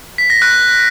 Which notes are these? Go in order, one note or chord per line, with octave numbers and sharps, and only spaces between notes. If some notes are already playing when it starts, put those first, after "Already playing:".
B6
A#6
F#6